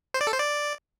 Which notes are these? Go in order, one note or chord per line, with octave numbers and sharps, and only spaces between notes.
C5
D5
A4
C5
D5